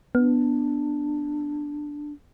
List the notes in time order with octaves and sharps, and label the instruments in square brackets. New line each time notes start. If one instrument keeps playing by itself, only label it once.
[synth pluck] B3 [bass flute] D4